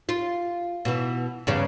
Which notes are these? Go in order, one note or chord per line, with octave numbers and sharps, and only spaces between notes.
F4
B2 E3
E2 G2 C#3